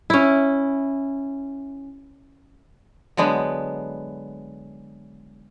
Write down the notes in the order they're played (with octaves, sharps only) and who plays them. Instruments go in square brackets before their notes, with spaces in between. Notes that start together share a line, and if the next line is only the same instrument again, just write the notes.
[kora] C#4 E4
[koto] D3 F#3 G#3 B3